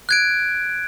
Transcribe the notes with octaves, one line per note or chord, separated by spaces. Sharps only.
F#6 G#6 D7